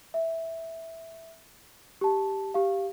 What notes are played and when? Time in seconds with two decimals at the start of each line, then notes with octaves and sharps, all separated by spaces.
0.14 E5
2.01 G4 A5
2.54 G4 F5